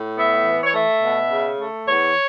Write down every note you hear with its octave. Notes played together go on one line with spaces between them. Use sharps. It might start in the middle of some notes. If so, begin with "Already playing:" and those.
Already playing: A2
B3 E5
E3
C#5
A3 E5
B2
C#3
A3
E2 C#5